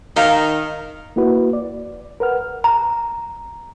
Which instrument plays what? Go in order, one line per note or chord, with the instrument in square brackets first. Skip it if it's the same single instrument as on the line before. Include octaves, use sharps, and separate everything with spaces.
[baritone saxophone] D#3 [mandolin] D#4 A#4 [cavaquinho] F5
[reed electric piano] A#3 E4 F#4 B4
D5
A#4 B4 F#5 F6
[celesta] A#5